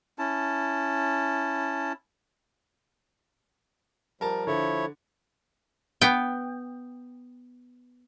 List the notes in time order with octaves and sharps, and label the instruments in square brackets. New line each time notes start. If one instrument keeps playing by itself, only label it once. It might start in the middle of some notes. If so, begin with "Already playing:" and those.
[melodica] C#4 E4 A5
[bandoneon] F3 G3 [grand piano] A#4 A5
[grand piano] D3 [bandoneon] F3 E4 C#5
[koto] B3 G5